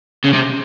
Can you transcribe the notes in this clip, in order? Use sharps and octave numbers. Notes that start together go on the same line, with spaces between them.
C#3
C3